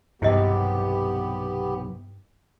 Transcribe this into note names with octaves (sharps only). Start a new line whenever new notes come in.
B1 E2 G2 C3 B3 E4 G4 D#5